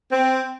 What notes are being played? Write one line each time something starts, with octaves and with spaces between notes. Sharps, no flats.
C4